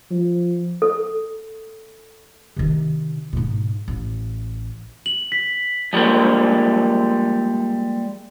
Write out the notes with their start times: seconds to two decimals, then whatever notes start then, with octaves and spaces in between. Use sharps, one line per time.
0.11 F3
0.82 A4
2.56 C3 D#3
3.33 G#2 B2
3.88 A1
5.06 F#7
5.32 B6
5.93 F3 G3 G#3 A#3